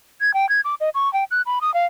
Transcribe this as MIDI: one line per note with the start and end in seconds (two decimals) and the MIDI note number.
0.21 0.34 92
0.34 0.48 79
0.49 0.61 92
0.65 0.75 86
0.80 0.90 75
0.95 1.11 85
1.13 1.24 79
1.31 1.42 90
1.46 1.59 83
1.61 1.73 87
1.74 1.86 77